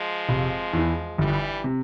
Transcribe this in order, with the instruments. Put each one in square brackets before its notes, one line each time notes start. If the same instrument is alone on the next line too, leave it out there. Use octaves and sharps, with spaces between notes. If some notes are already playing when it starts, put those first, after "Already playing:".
Already playing: [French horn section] F3 G#3
[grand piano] F1
E2 E3
[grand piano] G1 [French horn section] E3 G3
[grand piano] C3